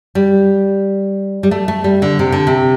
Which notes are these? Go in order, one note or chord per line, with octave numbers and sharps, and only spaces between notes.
G3
G3
A3
A3
G3
D3
C3
D3
C3